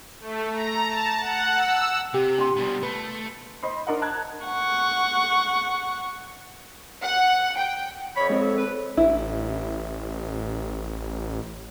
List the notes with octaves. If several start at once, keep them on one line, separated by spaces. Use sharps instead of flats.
A3
A#5
A5
F#5
E6
C3 G4
D4 F4 C6
B2 G3
A3 B4
C5 D#5 B5 C6
D4 A#4 D#5 F#5
A5 A#5 F#6 G#6
F#5 C#6
F#5
G5
F2 C#5 B5
G#3 C4 D#5
A4
B4
A1 E4